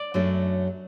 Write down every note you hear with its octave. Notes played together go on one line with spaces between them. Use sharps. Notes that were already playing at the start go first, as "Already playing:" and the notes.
Already playing: D5
F#2 F#3 A3 D4